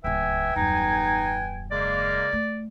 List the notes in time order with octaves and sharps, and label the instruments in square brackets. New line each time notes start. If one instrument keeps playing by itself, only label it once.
[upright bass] D1 C#2 [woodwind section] B4 G5 G#5 [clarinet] E5
[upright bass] D#1 F#2 [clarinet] D#4
[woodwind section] C#3 G#3 A#3 [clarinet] D5
[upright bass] A3